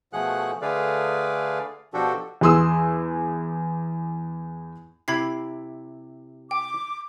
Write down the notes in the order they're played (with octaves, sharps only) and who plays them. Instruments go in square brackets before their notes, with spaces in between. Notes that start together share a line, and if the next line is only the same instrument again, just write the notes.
[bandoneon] B2 F3 A3 G#4 F#5 F#6
D3 A3 G#4 B4 D5 F5
B2 F3 D4 F#4 G4 A4
[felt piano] E2 G#4 C6 D#6 E6
[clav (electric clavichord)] C3 E4 G4 [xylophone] B5 G#6 C7
[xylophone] G5 [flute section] D6